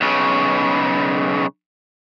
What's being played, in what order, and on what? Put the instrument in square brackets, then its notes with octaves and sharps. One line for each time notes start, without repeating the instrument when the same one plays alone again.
[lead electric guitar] B1 C#3